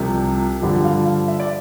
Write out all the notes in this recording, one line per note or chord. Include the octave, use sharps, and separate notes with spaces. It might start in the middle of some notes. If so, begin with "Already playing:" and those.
Already playing: C2 C3 F3
G2 D3 F3 G4
F5
F5
E5
D5